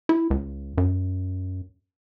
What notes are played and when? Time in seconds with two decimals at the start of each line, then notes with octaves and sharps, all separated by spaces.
0.09 E4
0.30 C#2
0.78 F#2